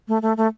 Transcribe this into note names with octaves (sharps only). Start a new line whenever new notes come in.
A3
A3
A3